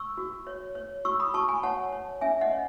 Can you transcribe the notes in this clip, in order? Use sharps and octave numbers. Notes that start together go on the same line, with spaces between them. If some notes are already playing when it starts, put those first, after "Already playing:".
Already playing: C#6 E6
F#4
C#5
C#5
F#4 C#6 E6
B5 D#6
F#4 A5 C#6
G#5 B5
C#5 F#5 A5
C#5
C#4 E5 G#5
D#5 F#5
C#5